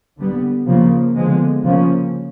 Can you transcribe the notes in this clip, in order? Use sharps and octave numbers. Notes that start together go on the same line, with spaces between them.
D3 G3 B3
C#3 F3 A#3
D3 F3 G#3 B3
C#3 F3 A#3 C#4